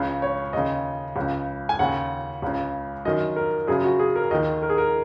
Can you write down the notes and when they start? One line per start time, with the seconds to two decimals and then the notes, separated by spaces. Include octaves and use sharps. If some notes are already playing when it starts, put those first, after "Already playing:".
Already playing: C#2 C#3
0.22 C#5
0.53 D#2 C#3 D#5
1.16 C#2
1.21 C#3
1.69 G#5
1.79 D#2 C#3 F#5
2.42 C#2 C#3
3.05 F#2 D#3 D#5
3.36 A#4
3.68 F#2 C#3 G#4
3.84 F#4
4.00 G#4
4.16 A#4
4.31 D#2 D#3 D#5
4.62 A#4
4.70 G#4
4.78 A#4